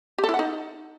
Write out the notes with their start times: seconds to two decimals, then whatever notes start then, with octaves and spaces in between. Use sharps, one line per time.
0.18 G4
0.24 A4
0.29 E4
0.34 F#5
0.39 D#4